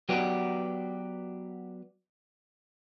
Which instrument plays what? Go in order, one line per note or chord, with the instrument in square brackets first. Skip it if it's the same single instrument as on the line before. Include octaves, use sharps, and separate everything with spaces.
[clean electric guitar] F#3 B3 F#4 G4 B4 D5